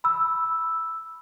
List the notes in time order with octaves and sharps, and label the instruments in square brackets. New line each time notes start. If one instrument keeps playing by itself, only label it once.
[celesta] B5 E6